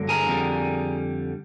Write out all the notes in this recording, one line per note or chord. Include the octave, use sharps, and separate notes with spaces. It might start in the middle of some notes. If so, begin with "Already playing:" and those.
Already playing: G2 D3 F#3 A#3
G#4 A#4
F2 D3 G3